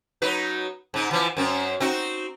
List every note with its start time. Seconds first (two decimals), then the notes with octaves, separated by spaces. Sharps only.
0.22 F#3 D#4 B4
0.94 G#2 D#4
1.11 E3 F3
1.37 F#2 C4
1.80 C4 D#4 F#4